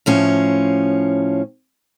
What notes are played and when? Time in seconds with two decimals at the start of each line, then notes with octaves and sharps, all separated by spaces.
0.06 A2 F3 C#4